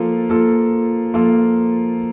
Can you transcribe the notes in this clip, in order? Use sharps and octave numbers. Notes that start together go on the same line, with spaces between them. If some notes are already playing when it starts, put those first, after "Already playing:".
Already playing: F3 A#3 F4 A4
F3 A#3 F4 A4
F3 A#3 F4 A4